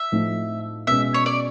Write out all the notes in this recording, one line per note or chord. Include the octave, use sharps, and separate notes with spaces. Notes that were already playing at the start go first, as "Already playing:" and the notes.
Already playing: E5
A2 F3 A3 C4 D#4
B2 G#3 C#4 E5
C#5
D5